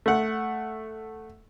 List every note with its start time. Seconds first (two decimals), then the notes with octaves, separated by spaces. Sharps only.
0.06 A3 F#5